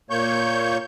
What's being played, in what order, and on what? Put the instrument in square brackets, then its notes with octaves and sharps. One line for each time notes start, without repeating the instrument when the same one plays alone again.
[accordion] A#2 A#3 C#5 C#6 G6